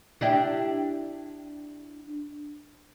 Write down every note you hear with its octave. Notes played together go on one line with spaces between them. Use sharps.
D4 E4 G4